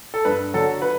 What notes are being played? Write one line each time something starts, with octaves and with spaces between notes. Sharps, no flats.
A4
G2 B4
D3 F#3 A4
B4